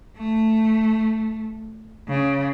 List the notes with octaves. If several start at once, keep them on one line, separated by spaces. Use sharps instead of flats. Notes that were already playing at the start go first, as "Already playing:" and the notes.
A3
C#3